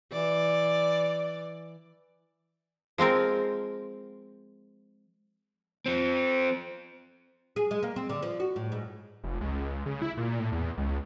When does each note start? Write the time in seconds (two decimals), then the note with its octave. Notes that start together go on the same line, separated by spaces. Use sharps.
0.12 E3 D5
2.98 F3 G#3 C4 A#4
5.86 F3 C4
7.56 G#4
7.71 G#3
7.83 A#3
7.96 C4
8.09 D3
8.22 F3
8.40 F#4
8.56 A2
8.72 G#2
9.24 F1
9.41 C#2
9.86 C#3
10.02 E4
10.17 A#2
10.39 A2
10.52 E2
10.77 C#2